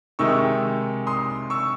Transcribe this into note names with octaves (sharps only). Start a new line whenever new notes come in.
C3 D#3 G#3 D#4 C#6 E6
C6 D#6
C#6 E6